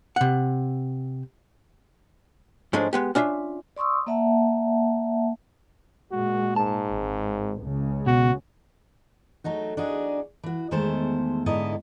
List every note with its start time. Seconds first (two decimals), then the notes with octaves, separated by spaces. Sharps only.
0.16 C3 F#5
2.73 G#2 F3 G#3 A3 C#4 D4
2.93 G#3 B3 G4
3.15 C#4 D4 F4 E5
3.77 D5 C6 C#6 D#6 E6
4.07 A#3 D5 E5 F#5 A5
6.11 A#2 G#3 F#4
6.56 G#2 A5
6.88 G#1
7.62 C#2 C#3
8.06 B2 F#4
9.44 F#3 A3 D#4 F#4
9.77 D4 D#4 F#4 G#4
10.43 E3 F#4
10.71 E2 D#3 G#3 A3 C5 A5
11.46 G#2 D3 B3 E4 D#5 A#5